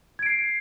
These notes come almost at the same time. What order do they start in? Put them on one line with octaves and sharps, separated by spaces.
G#6 D7 C7